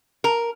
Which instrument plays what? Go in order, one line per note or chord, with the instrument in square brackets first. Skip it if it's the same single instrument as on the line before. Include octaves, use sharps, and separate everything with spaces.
[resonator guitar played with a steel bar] A#4